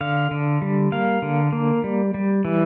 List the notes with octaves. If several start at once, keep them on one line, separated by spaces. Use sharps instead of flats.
D3 F5
D3
G3
A#3 F5
D3
A#3
G3
G3
E3